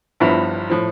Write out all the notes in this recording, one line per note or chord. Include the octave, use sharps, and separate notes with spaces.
G1 G2 F3 B3 E4
A2 F3